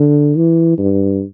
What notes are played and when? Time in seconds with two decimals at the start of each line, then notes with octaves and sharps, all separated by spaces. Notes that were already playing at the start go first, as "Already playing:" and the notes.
Already playing: D3
0.36 E3
0.78 G2